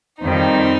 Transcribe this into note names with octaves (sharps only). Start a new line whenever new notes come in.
F2 D#3 G3 C4 D#4